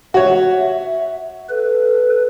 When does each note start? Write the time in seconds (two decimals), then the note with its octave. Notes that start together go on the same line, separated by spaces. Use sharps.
0.14 F#4 C#5 E5
1.50 A4 B4